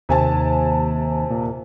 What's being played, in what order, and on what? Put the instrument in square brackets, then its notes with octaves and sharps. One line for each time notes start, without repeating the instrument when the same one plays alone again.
[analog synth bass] D#2 [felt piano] C3 G#5 A5
[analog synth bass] A#2